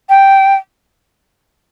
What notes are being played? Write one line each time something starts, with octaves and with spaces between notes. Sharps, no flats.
G5